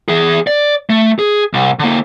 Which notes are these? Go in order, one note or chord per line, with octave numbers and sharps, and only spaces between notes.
E3 G#4
D5
A3
G#4
C2
D3 A#3